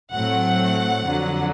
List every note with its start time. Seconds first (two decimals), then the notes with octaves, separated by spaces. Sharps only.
0.13 A2 F#3 A3 C4 F#5
1.05 F2 D3 F#3